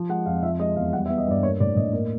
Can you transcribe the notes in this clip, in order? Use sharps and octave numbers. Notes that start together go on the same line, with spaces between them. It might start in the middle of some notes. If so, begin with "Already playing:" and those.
Already playing: F3
G#3 F#5
F2 F5
F3 E5
G#3 D#5
E2 F5
G3 F#5
E5
B3
D#5
G2 D5
A#3 C#5
A2 D5
A2 D#5
A#3